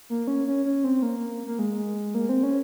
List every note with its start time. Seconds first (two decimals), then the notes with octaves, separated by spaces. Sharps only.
0.10 A#3
0.27 C#4
0.47 C#4
0.65 C#4
0.84 C4
1.02 A#3
1.47 A#3
1.59 G#3
2.15 A#3
2.29 C4
2.43 C#4